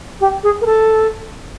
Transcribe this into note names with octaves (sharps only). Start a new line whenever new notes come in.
G4
G#4
A#4
A4